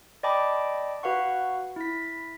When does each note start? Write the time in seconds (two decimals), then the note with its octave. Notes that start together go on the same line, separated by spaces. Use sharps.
0.23 D5 D#5 G5 A5 B5 D6
1.03 F#4 B4 F5 F#5 C#6
1.76 E4 B6